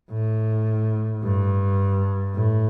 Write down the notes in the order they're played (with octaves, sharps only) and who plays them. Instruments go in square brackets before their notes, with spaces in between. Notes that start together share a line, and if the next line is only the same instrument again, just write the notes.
[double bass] A2
G2
A2